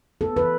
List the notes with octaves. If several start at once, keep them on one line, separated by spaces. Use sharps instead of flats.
B3 A4
E3 B4